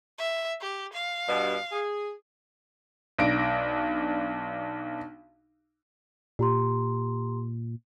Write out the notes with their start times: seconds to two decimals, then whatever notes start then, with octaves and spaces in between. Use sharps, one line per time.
0.18 E5
0.61 G4
0.93 F5
1.28 G2 B2
1.72 G#4
3.18 B1 D4 A#6 D7
6.39 A#2 G4 A#5 C6